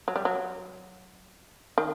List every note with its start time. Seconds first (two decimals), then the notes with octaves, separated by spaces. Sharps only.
0.08 F#3
0.16 G3
0.25 F#3
1.78 D#3